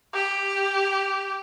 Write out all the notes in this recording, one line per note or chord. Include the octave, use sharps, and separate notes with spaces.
G4